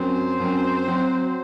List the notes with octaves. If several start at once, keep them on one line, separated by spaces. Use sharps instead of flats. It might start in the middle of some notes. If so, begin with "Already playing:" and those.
Already playing: F#2 F#3 C4 C5
F#2 F#3 C4
F#3 C4 F#4